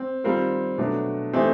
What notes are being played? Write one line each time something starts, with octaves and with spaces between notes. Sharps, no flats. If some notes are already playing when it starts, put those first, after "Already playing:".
Already playing: C4
D#3 G3 C4 F4 A#4
B2 F#3 A3 D4
E3 A3 C4 D#4 G4